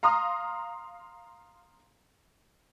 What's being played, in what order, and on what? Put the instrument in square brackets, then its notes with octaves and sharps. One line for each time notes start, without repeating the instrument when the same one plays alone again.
[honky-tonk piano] F5 A#5 C6 D#6 F6